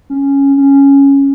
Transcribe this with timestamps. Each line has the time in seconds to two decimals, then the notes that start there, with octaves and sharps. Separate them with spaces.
0.10 C#4
0.57 C#4